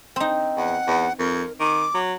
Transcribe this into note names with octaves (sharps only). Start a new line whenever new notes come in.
C4 D#4
E2 F#5
E2
F2 A#4
D#3 D6
F#3